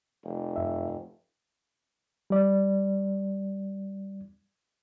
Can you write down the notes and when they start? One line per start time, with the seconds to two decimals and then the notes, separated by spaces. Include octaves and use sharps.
0.24 F1
0.56 F#2 E5
2.30 G3 D5